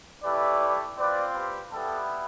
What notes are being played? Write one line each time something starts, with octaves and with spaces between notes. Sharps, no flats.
A3 E4 G4 B4 D5
C4 F4 B4 D5
G4 B4
G3 B3 E4 G4 A4